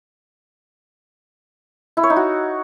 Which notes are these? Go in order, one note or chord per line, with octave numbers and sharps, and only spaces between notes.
E4
C#5
D#4
F#4